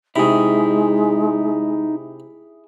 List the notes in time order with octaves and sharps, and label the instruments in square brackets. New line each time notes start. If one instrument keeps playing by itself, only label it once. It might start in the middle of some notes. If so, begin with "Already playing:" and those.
[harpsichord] C3 [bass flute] G#3 [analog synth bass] D#4 [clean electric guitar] E4 G#4